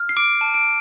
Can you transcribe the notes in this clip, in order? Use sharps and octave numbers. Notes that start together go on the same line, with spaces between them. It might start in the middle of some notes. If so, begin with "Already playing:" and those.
Already playing: F6
C7
D6 D7
A5
D7